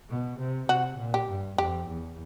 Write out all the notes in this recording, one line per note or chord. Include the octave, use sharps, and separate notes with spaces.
B2
C3
C3 F#4
A#2
G4
G2
F2 G4
E2